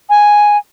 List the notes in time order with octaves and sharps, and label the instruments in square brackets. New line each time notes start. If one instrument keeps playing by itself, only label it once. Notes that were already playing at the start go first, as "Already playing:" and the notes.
[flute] G#5